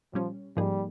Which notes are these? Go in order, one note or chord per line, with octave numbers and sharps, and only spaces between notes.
A#2 F3 G3 C#4
G#2 F3 G3 A#3 D#4 G#4